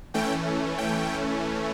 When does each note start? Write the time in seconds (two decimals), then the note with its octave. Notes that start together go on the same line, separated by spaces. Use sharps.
0.14 E3 A3 C#4 G5
0.78 G5